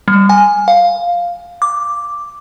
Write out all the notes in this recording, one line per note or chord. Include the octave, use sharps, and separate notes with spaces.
G3
G#5
F5
D6